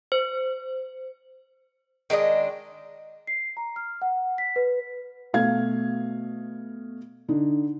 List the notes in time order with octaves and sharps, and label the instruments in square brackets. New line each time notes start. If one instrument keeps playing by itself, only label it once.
[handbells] C5
[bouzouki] D#3 G#3 D4 D#5
[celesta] C7
A#5
F6
F#5
B6
B4
[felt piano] B2 A3 F5 G#6
D3 D#4